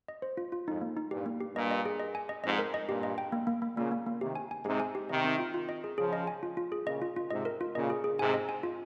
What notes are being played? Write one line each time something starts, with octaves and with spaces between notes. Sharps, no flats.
D#5
C5
F4
F4
F2 G#2 D#4
A#3
D#4
G2 A#2 G4
A#3
G4
G2 A#2 D#5
D#5
G#4
D#5
G#5
D#5
F2 G#2 D#5
A#4
D#5
G2 A#2 G4
D#5
G5
A#3
A#3
A#3
A#2 C#3 A#3
A#3
A#3
C3 D#3 G4
G#5
G#5
G#2 C3 G4
G#5
G4
C3 D#3 D#5
C4
F4
F4
D#5
G#4
C#3 F3 G#4
D#5
G#5
F4
F4
G#4
A#2 C#3 D#5
F4
F4
G#2 C3 D#5
A#4
F4
A#2 C#3 D#5
G#4
G#4
G#2 C3 G#5
D#5
G#5
F4